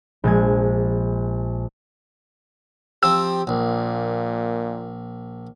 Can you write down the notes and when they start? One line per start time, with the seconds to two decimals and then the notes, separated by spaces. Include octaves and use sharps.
0.24 A#1 G#3 G#6
3.03 F3 C4 G4 E6
3.47 A#1 A#2